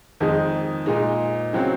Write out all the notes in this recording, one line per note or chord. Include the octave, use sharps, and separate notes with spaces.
F2 D#3 G#3 D#4
A#2 G#3 D#4
C#3 F#3 C4